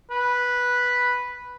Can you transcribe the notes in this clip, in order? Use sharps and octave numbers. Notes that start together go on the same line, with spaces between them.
B4